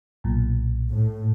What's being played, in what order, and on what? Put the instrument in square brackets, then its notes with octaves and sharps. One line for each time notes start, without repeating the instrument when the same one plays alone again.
[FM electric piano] B1 A#2
[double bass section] A2